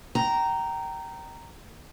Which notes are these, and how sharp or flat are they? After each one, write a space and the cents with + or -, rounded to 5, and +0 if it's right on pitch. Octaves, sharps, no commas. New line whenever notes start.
G5 -25 A#5 -5